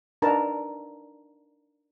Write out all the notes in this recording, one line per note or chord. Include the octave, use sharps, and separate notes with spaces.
D4 D#4 A#4 B4 A5 A#5